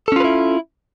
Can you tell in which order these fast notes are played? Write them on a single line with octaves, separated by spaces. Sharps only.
A4 C#4 F4 B4 E4